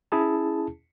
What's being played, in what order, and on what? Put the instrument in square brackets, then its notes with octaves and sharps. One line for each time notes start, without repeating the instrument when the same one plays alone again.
[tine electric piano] C#4 E4 G#4 A5